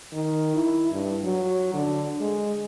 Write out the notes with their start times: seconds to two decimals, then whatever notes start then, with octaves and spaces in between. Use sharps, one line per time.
0.13 D#3
0.56 E4
0.92 G2
1.24 F#3
1.74 D3
2.21 G#3